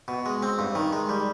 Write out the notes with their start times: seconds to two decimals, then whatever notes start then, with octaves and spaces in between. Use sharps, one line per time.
0.08 B2
0.26 G#3
0.43 C4
0.59 G2
0.75 D#3
0.93 G#3
1.09 G3